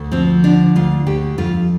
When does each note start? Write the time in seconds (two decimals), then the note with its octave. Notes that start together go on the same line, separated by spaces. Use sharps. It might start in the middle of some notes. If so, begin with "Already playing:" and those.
Already playing: D2
0.12 F3 C4
0.44 D3 D4
0.76 D2 F4
1.07 D2 G4
1.38 F2 F4